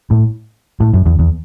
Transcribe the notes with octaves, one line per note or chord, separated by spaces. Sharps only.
A2
A2
F#2
E2
E2